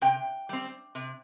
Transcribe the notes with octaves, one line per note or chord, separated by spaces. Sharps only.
C3 G5
G3 C4
C3